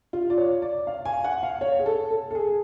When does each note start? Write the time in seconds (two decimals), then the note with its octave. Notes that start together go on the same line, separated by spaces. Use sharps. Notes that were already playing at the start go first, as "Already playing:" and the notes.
0.13 F4
0.30 D5
0.38 C#5
0.62 D5
0.87 F5
1.05 G#5
1.24 F#5
1.43 F5
1.61 C#5
1.79 G#4
1.86 A4
2.11 A4
2.31 A4
2.35 G#4